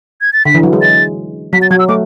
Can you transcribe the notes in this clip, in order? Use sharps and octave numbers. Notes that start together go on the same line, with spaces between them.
G#6
A6
D3 B6
E3
F#3
G#3
A6
F#3 B6
A6
F#3 G#6
E6
A3 D6